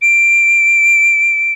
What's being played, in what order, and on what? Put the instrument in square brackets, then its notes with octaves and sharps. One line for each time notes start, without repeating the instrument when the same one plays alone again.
[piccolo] D7